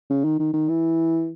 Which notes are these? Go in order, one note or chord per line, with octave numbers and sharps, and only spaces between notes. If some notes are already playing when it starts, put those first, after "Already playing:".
C#3
D#3
D#3
D#3
E3